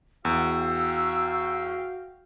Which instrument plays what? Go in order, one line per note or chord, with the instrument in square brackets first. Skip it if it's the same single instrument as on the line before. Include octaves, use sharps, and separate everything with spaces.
[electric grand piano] E2 [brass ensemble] F#4 F5 G5 [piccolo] E6